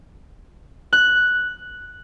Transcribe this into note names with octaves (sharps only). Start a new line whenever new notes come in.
F#6